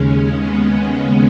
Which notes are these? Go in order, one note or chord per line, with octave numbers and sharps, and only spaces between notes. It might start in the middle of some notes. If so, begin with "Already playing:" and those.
Already playing: D#2 C#3 G#3 C#4
B3